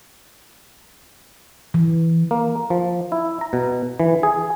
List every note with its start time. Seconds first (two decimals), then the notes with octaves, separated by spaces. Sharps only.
1.74 E3
2.31 A#3
2.70 F3
3.12 E4
3.41 A#5
3.53 B2
4.00 E3
4.23 G#4